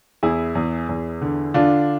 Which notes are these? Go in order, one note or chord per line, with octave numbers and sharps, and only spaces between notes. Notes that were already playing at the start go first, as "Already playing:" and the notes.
E2 E4 G#4
E2
E2
D3
D3 D4 F4